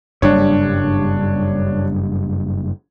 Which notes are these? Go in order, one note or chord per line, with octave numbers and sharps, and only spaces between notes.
F#1 G2 G3 D4 C#5